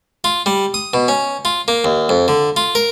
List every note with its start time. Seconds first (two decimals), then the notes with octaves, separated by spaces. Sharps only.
0.24 F4
0.46 G3
0.74 D#6
0.94 B2
1.08 C#4
1.45 F4
1.68 A#3
1.84 D#2
2.09 F2
2.28 D3
2.56 F4
2.75 A#4